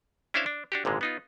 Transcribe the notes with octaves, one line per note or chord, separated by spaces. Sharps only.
C#4 D4 E4 C5 E5 F5
D4
D4 F#4 G4
G#1 A#2 D3 G#3
B3 D#4 F4